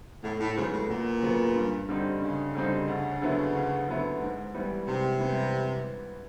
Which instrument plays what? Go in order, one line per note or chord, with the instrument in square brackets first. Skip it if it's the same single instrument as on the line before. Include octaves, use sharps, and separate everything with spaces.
[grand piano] E2 [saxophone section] A2
[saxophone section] A2
[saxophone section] G#2 [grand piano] C#3 F#3 B3
[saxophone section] A2
[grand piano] E2 [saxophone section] A#2
[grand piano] C#3 F#3 B3
G2
D3 G3 C4 D#4
[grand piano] G2 [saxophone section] C#3
[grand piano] D3 G3 C4 D#4
D2
D3 F#3 B3 E4
D2
D3 F#3 B3 E4
G#2
E3 G3 B3
[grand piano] G#2 [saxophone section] C3
[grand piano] E3 G3 B3